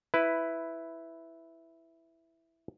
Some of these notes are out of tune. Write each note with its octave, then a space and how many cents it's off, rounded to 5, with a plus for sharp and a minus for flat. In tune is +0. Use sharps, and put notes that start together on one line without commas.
E4 +0 B4 +10